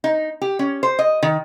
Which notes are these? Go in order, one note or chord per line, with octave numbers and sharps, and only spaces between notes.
D#4
G4
C#4
C5
D#5
D#3